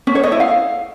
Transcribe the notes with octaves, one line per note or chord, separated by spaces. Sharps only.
C#4
C#5
D#5
E4
F5